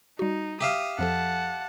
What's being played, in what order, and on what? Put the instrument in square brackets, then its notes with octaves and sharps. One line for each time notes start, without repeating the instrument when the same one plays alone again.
[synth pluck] G3 F#4 [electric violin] D#4
[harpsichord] G4 E5 F5 [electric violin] D#6
[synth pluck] F2 F3 A4 [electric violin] F#5 A5